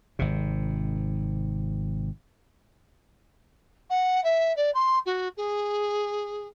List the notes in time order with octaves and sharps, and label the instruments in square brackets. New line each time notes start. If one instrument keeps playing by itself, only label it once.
[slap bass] G#1 C3
[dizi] F#5
E5
D5
C6
F#4
G#4